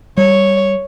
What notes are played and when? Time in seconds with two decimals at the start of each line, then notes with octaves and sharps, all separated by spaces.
0.17 G3 C#5